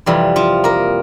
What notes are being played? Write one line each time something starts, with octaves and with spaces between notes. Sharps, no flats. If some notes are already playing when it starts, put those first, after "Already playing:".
F2 C3 E3 G3
F3 F4
A#3 A#4